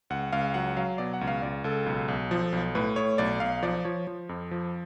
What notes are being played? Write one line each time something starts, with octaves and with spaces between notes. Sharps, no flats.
C#2 F#5
C#2 F5
F#3 F#5
F#3 F5
B2 D5
F#5
C#2
F5
C#2 D5
C#2 A4
B1
B1
F3
B1
A2 B4
A2 C#5
B1 D5
B1 F5
F3 D5
F3 C#5
F3
F2
F3